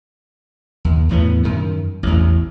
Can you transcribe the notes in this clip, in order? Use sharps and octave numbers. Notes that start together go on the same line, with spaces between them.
D#2
E2 A2 B3
F#2 D#3
A1 E2